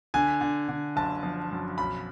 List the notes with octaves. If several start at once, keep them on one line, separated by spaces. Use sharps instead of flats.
D3 G#5
D3
D3
F#1 A5
F3
F#2
B1 B5